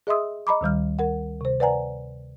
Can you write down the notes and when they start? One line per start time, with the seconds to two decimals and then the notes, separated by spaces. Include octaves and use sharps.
0.07 G#4 D#5 E5 C6 D#6 E6
0.47 D#5 A#5 B5 D6
0.61 D2 D#3 G3 F6
0.99 A#4 F#5
1.41 C3 C5
1.60 B4 D5 F#5 G#5 A#5